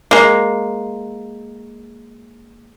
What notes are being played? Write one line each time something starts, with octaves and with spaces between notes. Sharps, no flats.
G#3 A#3